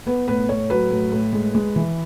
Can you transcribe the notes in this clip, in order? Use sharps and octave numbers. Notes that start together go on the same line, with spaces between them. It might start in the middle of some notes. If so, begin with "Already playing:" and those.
B3 B4
A2 B4
A2 C#5
F#3 B4
A2
A2
G#3
G#3
E3